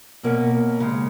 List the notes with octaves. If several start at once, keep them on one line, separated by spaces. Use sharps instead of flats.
B2 A#3 C#4
D#2 C#3 G#3